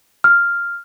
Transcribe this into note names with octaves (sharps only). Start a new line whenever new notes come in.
F6